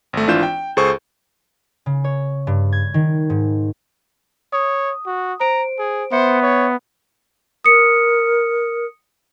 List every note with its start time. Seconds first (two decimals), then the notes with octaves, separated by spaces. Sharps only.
0.13 G#1 A3
0.27 G#1 E3 D4 F4 G6 E7
0.43 G5
0.77 C#2 G#4 A4 C5 C#6
1.86 C#3
2.04 C#5
2.47 G2
2.72 G#6
2.94 D#3
3.30 G#2
4.53 C#5 D#6
5.06 F#4
5.40 C5 A#5 D7
5.79 G#4
6.12 B3 C5 E5 C#7
6.43 C#5
7.64 A#4 D#6 C#7